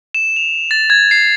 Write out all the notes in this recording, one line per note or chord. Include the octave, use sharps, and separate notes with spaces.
E7
F7
A6
G#6
C7